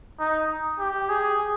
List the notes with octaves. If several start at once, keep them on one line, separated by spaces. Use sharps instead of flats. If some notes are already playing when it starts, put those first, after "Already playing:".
D#4
G4
G#4